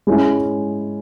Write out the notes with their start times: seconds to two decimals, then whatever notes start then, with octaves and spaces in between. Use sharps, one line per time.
0.07 G#3 C#4 E4